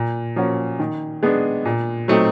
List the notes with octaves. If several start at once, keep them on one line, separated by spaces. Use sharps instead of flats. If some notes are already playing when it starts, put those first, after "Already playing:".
Already playing: A#2
F3 A#3 C#4 F#4
D#3
G#3 B3 D4
A#2
F#3 A3 C4 D#4